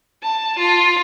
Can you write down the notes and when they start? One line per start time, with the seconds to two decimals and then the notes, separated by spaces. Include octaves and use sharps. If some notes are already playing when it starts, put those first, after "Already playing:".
0.23 A5
0.59 F4